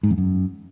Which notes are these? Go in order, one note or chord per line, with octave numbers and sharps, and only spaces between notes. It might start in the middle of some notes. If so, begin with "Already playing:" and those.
G#2
F2
F#2